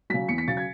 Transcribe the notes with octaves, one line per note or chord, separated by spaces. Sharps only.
C#3 F#3 B6
E2 C#7
B6
C#3 F#3 A6
G#6